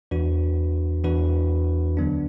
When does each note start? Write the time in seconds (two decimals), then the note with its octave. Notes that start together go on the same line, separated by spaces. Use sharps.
0.11 E2 E3 D4 F#4 B4
1.04 E2 E3 D4 F#4 B4
1.97 D2 D3 F#3 B3 D4